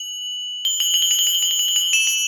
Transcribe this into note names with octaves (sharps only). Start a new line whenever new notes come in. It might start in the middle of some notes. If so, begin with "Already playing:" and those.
Already playing: F#7
G7
F#7
F#7
G7
F#7
G7
F#7
G7
F#7
G7
F#7
G7
F#7
E7
F#7